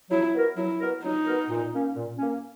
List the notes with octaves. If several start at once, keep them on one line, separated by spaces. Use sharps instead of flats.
F#3 E4
B3 F#4 A#4
F#3 E4
B3 F#4 A#4
F#3 D#4
B3 F#4 A#4
A#2
A#3 C#4
A#2
A#3 C#4